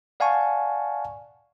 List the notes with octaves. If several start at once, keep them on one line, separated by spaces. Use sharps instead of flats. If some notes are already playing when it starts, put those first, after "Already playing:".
D5 F5 F#5 G#5 A5 C#6